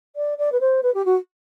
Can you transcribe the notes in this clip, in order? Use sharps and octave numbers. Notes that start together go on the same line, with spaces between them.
D5
D5
B4
C5
B4
G4
F#4